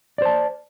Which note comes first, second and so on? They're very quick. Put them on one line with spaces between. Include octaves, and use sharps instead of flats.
D5 C5 A5